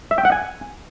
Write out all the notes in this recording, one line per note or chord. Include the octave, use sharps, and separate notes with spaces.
E5
G5
F#5
G#5